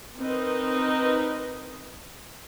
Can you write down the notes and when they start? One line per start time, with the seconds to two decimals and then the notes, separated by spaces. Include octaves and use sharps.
0.19 C4 D#4 A#4 B4 D#5